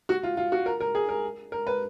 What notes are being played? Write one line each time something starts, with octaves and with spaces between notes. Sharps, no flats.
F#4
F4
F4
F#4
A#4
A#4
G#4
A#4
A#4
B4